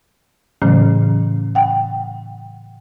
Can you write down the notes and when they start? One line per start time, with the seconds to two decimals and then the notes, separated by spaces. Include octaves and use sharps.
0.62 A2 C#3 E3 F#3 A3 C#4
1.55 F#5 G5